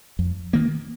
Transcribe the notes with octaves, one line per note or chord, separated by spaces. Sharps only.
F2
D#3 A#3